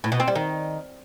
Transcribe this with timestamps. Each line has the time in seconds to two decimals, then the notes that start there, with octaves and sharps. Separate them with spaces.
0.04 A2
0.12 B2
0.20 C4
0.28 G3
0.35 D#3